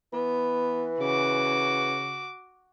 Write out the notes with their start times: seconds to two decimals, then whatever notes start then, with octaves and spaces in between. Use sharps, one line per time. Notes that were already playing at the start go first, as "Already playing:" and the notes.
0.13 E3 B3
1.00 C#3 F#4 D6